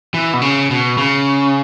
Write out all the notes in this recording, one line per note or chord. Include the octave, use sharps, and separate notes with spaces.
E3
B2
C#3
B2
C#3